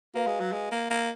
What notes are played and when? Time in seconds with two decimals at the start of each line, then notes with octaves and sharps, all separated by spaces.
0.14 A#3 F#4 B4 F5 A#5
0.27 G#3
0.40 F#3
0.52 G#3
0.71 A#3
0.90 A#3